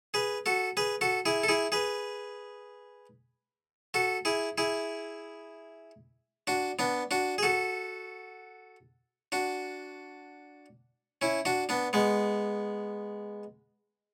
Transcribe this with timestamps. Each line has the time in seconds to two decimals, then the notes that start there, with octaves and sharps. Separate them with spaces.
0.14 G#4 B4
0.46 F#4 A4
0.77 G#4 B4
1.01 F#4 A4
1.26 E4 G#4
1.43 A4
1.48 E4 G#4
1.72 G#4 B4
3.94 F#4 A4
4.25 E4 G#4
4.58 E4 G#4
6.47 D4 F#4
6.79 B3 D4
7.11 D4 F#4
7.38 G#4
7.43 F#4 A4
9.32 D4 F#4
11.22 C#4 E4
11.45 D4 F#4
11.69 B3 D4
11.93 G#3 B3